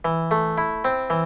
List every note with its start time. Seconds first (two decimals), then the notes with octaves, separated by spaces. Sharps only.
0.05 E3
0.31 A3
0.58 E4
0.85 C4
1.10 E3